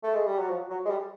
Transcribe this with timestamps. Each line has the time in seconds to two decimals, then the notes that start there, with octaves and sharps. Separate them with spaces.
0.03 A3
0.14 G#3
0.26 G3
0.39 F#3
0.50 F3
0.70 F#3
0.85 G#3
0.89 G3